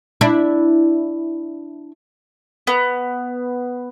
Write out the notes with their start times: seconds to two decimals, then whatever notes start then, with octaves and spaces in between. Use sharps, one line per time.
0.21 D4 E4
2.67 B3